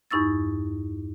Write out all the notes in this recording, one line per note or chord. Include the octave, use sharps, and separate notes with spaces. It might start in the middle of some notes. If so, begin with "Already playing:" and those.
E2 G2 D#4 C#6 E6 A6